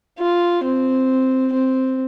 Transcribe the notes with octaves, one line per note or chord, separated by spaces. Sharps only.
F4
C4
C4